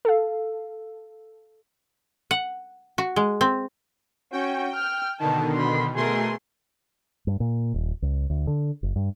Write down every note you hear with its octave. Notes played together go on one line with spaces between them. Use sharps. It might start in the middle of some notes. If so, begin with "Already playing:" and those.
A4 F5
F#5
F#4
G#3
C4
C#4 F#4 G5
F6
B2 D3 D#3 A5
B5 C6
B2 A3 G#4 A#4 C6
G2
A#2
D#1
C#2
D2
D3
F#1
G2